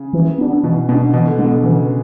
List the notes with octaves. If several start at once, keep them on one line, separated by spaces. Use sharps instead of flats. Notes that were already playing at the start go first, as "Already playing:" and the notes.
Already playing: C#3
E3
B3 D4
B2 E3
B2 B3 D4
B2 E3
D3
D3 G#3 B3
B2
C#3 E3